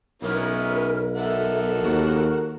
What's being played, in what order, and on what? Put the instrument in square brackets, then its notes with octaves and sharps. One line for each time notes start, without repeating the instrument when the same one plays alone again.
[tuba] B1 [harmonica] B3 C#4 E4 [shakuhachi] A#4
[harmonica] A4 A#4 F#5 [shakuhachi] E5
[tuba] D#2 [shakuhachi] F#4